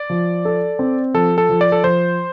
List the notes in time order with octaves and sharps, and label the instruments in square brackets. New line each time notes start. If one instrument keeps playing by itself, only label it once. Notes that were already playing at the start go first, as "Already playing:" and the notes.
Already playing: [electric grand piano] D5
[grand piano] F3
A4
C4
[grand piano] F3 [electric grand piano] A4
[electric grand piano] A4
[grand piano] F3
[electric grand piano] D5
A4
[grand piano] F3 [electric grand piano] C5